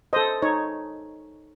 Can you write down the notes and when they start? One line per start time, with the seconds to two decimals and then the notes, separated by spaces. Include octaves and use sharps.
0.13 A4 C5 D#5
0.42 D#4 C#5